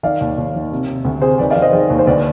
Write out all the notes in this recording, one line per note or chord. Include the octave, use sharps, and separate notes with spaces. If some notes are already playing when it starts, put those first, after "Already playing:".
D#3 D5 F5
D#2
D#2
D#3
C3
C3
D2
C3 G#4 C5
D#3 B4 D5
D5 F5
D#3
C5 D#5
D#3 G#4 C5
D#2
C5
D2 B4 D5